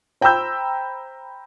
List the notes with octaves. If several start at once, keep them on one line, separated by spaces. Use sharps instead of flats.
C5 G5 A#5 B5 E6 G6